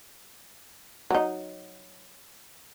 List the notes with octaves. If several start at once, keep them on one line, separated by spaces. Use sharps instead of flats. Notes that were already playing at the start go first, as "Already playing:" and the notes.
F#3 D#4